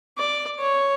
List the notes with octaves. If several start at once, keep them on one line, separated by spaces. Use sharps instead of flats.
D5
C#5